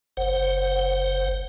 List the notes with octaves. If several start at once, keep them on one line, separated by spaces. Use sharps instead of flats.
F#1 C5 F#5